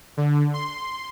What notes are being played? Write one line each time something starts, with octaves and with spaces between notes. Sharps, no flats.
D3
C6